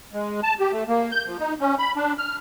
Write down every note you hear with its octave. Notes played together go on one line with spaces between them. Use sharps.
G#3
A5
G4
A3
A#3
G6
F3
D#4
C#4
B5
D4
F6